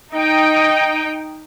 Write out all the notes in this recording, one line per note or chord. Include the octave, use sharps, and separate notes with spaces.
D#4 D#5 G5